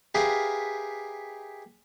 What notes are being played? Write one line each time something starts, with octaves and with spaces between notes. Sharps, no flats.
G4 G#4 A#4 B4 E5 F5